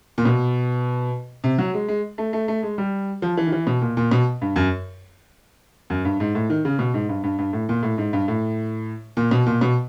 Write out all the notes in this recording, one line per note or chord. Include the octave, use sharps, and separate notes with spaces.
A#2
B2
C3
F#3
G#3
G#3
A3
A3
A3
G#3
G3
F3
E3
D#3
E3
B2
A#2
A#2
B2
G2
F#2
F#2
G2
G#2
A2
D#3
C#3
B2
G#2
G2
G2
G2
A2
A#2
A2
G#2
G2
A2
A#2
B2
A#2
B2